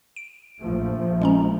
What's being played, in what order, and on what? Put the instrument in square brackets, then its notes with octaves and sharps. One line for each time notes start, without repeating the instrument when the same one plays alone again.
[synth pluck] D7
[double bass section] A#1 F3 A3
[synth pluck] G#3 C#4 A#5